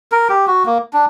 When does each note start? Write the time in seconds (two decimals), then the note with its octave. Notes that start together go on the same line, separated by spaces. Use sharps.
0.12 A#4
0.29 G4
0.47 F#4
0.66 A#3
0.93 D4